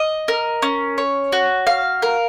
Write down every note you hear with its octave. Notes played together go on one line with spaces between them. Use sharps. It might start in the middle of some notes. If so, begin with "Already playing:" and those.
Already playing: D#5
A#4
C#4
C#5
F#4
F5
A#4